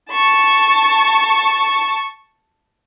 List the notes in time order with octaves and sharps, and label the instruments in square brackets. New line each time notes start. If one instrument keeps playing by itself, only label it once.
[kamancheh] A5 C#6